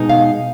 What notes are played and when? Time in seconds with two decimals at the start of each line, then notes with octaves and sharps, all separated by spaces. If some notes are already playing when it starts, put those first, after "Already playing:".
Already playing: B2 G#3 D#4
0.09 F5